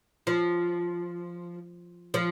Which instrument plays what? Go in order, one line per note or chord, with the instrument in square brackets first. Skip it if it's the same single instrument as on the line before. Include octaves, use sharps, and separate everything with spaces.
[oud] F3
F3